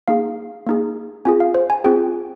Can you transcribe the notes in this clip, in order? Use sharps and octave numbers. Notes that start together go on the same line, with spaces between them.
A#3 D#4 G#4 F5
A#3 D#4 G#4
C4 F4 G#4 G#5
F5
C5
G#5
C4 F4 G#4 G5